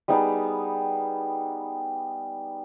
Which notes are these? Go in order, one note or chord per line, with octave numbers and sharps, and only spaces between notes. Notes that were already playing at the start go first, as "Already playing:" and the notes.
G3 B3 D#4 G#4